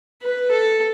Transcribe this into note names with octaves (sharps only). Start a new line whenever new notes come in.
B4
A4